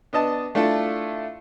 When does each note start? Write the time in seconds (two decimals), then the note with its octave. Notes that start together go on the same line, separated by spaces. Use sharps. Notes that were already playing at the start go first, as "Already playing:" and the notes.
0.13 B3 D4 D#5 A5
0.55 A3 D4 E4 F4 A4